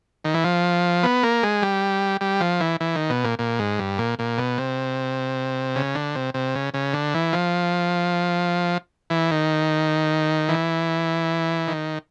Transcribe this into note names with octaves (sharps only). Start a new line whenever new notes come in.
D#3
E3
F3
B3
A#3
G#3
G3
G3
F3
E3
E3
D#3
B2
A#2
A#2
G#2
G2
A#2
A#2
B2
C3
C#3
D3
C3
C3
C#3
C#3
D3
E3
F3
E3
D#3
E3
D#3